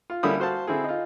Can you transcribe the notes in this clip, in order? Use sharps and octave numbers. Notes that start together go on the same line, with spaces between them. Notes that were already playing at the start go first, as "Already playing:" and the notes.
F4
D3 G3 A#3 C#4 E4 D#6
F#4 C5 F5 A5
D3 C4 E4 G#4
D#4 F4